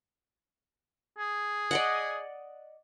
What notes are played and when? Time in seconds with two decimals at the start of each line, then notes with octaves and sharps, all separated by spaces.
1.18 G#4
1.71 D5 D#5 F#5